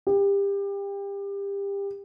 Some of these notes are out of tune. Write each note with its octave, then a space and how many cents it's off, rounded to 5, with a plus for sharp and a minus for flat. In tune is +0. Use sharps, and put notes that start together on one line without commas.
G4 +25